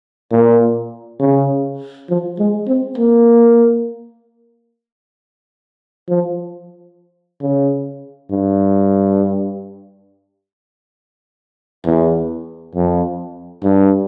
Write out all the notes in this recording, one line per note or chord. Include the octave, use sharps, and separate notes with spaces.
A#2
C#3
F3
G#3
C4
A#3
F3
C#3
G2
E2
F2
G2